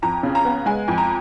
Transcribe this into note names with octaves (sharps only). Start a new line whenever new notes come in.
F2 A#5
C#3
A#5
B3
G#3 G#5
F2
A#5